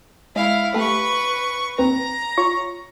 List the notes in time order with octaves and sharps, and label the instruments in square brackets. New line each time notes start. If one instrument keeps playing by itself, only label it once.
[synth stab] G#3 [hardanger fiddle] E4 F5
[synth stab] A3 G4 A4 [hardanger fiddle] B4 C#6
[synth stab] D#2 C4 B4 [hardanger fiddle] A#5
[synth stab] F4 C#5 C#6